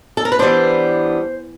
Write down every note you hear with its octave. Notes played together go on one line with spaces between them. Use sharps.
A4
A#4
B4
E3 G3 B3 D4 C5